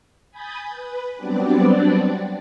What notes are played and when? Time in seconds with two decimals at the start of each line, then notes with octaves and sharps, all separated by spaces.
0.31 G#5 B5 D#6 G6 A6
0.69 B4
1.17 F#3 G3 B3 C4 D4 D5